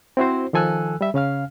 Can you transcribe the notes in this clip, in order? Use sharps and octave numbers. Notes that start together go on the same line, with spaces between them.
C4 E4 F#4 C5
D#3 F3 A4 G#5 E6 F#6
G3 E5
C#3 C#4 F5 F6